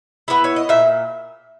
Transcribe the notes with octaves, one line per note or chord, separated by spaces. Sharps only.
B3 E4 B4
C#5
D#5
A#2 E5